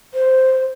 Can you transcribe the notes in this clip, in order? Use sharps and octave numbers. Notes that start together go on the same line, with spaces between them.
C5